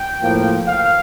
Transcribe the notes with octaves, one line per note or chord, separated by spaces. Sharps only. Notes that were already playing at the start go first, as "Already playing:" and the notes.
Already playing: G5
A2 F3 A#3
F5